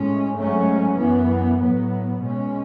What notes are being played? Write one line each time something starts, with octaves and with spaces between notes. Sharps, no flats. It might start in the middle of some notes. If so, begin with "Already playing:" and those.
Already playing: A2 G#3 C#4
G#2 F#3 A3 C#4
F#2 E3 B3
A2 F#3 B3
B2 G#3 C#4